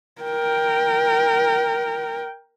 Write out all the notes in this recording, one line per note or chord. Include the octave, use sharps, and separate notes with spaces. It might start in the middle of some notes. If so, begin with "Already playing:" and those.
A#4 G5